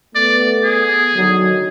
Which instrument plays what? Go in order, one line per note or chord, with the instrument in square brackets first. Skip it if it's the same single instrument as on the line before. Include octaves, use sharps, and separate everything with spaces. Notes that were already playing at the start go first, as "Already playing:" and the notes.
[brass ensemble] A3 B3 [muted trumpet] D5
[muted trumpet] G#4
[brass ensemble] D3 D#3 F#3